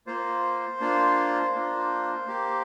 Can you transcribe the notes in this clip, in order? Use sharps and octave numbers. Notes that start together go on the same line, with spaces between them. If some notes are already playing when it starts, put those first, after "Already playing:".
A#3 F4 C5
A#3 D4 F4
A#3 D4 F4
A#3 G4